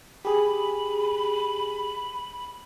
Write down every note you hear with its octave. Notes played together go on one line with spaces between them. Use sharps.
G4 G#4 B5